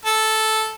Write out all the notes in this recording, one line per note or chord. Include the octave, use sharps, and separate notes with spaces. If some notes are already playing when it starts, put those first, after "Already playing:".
A4